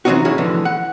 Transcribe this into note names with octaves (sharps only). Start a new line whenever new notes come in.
E3 F#3 C4 C#4 D#4 F#4
A2 C#4 E4 G#4
A2 D3 E3 F3
F#5